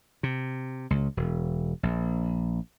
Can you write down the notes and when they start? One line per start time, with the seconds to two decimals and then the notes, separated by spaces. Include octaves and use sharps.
0.23 C3
0.90 C#2
1.17 E1
1.83 A#1